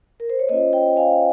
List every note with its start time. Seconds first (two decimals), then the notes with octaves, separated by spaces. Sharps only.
0.20 A#4
0.30 C5
0.39 C#5
0.49 A#3 C#4 F4 C5 D#5
0.73 D#5 G5
0.97 F5 G#5